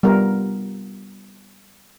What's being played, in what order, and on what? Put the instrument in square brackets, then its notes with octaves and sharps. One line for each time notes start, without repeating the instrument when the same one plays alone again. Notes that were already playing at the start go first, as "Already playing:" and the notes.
[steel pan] G3 B3 F4 A#4